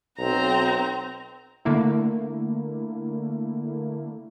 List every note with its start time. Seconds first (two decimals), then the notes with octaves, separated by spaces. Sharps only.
0.18 B1 C4 A#5
1.65 D3 A3 A#3 E4